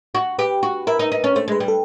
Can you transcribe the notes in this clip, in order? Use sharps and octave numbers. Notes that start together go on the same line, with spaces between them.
F#4
G4 B4
F#4
E4 A#4
D#4
D#4
C#4
A3 C5
G#3 B4
G3
A4